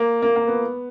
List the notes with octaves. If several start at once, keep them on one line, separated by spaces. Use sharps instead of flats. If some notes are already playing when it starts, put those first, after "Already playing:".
Already playing: A#3
A#3
A#3
B3